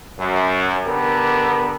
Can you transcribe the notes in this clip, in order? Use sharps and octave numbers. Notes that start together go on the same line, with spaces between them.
F#2
D3 B3 G4 A#4